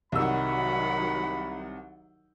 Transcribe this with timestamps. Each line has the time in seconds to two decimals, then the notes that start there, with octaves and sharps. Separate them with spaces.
0.12 C2 D#3 F#3 F#5 B5 E6